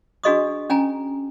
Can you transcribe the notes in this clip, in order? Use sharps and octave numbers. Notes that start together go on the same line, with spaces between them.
D4 F#4 G#4 D#5 C#6 D#6
C#4 G5 G#5 A#5